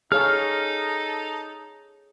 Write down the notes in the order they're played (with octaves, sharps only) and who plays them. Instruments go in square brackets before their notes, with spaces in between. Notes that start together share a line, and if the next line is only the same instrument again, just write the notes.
[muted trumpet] D#4 [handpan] G#4 C#5 F5 [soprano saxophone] A4 [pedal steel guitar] F6